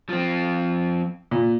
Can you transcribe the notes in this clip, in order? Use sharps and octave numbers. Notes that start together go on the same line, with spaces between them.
F3 C4
A#2